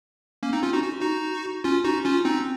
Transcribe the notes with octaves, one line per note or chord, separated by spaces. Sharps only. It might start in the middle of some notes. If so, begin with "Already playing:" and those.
A#3 C#4
C4 D#4
C#4 F4
D#4 F#4
F#4
D#4 F#4
C#4 F4
D#4 F#4
C#4 F4
C4 D#4